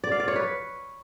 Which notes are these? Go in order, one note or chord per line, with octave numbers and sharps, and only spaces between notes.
D5
F5
D5
C#5
B4